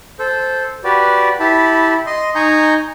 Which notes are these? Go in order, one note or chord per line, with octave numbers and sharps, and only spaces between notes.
A4 C5
F#4 G4 B4 D5
E4 G4 A5 B5
D#5 C6
D#4 G#5 A#5 C#6 G6